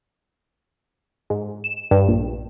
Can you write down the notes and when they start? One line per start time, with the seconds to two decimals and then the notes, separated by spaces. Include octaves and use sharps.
1.30 G#2
1.64 E7
1.91 G2
2.08 A#1